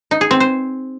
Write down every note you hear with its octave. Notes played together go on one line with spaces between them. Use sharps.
D#4
G#4
C4
C5